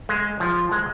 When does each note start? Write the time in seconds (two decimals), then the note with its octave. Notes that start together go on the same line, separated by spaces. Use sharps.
0.09 G#3
0.40 F3
0.72 G#3